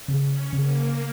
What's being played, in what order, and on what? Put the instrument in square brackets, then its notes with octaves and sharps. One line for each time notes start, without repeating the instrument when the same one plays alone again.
[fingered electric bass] C#3
[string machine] C#4
[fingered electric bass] C#3 [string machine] A#3